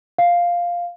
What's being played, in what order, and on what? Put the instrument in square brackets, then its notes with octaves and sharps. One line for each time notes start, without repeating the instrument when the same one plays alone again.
[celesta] F5